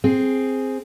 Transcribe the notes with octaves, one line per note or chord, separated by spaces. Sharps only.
C4 G#4